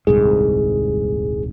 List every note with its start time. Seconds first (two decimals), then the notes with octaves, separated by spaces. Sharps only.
0.07 D#1 C2 G#2 G#4